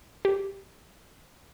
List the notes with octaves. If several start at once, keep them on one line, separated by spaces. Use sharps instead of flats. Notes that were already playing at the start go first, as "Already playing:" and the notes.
G4